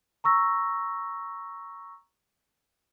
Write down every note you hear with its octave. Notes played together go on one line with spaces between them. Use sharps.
A#5 C#6 E6 A#6